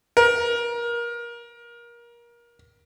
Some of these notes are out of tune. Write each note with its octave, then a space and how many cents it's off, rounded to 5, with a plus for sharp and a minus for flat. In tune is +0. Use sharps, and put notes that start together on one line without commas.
A#4 +25